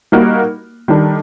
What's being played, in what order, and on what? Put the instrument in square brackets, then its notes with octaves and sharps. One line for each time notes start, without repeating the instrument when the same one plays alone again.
[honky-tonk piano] G3 A#3 D#4 F#4 A#4
D#3 G3 D4 A4